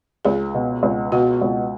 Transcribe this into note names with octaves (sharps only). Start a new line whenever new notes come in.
C#2 G#4
B2
C#2
B2 F#4
C#2